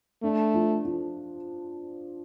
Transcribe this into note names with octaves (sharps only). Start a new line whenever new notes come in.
A3 D4
F3
F3